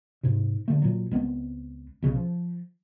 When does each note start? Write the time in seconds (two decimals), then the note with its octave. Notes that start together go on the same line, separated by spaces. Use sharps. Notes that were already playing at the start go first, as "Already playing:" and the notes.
0.23 G#2 C3
0.68 D3 A3
0.82 A#2 F#3
1.11 C#2 G#3 B3 C4
2.02 B1 C#3
2.16 F3